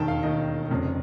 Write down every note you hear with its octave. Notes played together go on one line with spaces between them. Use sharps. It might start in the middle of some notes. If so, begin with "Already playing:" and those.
Already playing: E1 D#2 D#3 G5 A5
F5
E1 D#2 D#3 D#5
F1 F2 C#3